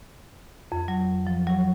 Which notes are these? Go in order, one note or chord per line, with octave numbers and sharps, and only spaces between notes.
F2
F#3
F3
F#3